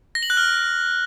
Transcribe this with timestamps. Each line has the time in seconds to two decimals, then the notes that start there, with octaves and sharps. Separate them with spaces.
0.15 A#6
0.23 F#7
0.30 F#6
0.37 F6